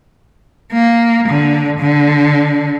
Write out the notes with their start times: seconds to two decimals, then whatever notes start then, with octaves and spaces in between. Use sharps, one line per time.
0.73 A#3
1.29 D3
1.80 D3